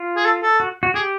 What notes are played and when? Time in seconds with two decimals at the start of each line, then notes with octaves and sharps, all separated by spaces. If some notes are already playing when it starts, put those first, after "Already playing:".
Already playing: F4
0.16 G#4
0.25 A4
0.43 A4
0.60 F#4
0.83 F#4
0.94 G4 G#4